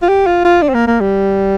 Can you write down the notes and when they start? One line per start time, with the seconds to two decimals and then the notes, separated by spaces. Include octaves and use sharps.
0.02 F4
0.09 G4
0.27 F4
0.45 F4
0.62 D4
0.69 C4
0.74 A#3
0.87 A#3
1.00 G3